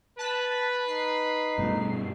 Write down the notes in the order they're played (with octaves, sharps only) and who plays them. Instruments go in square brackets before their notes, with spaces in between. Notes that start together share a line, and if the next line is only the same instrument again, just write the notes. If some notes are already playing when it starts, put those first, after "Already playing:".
[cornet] B4 [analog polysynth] A5 F#6 B6
[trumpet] D#4 [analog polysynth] C7
[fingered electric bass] G2 B2 A3